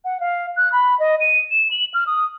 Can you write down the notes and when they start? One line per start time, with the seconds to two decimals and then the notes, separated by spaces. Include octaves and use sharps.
0.05 F#5
0.20 F5
0.56 F#6
0.72 B5
0.99 D#5
1.20 D#7
1.51 E7
1.71 F#7
1.94 F6
2.07 D#6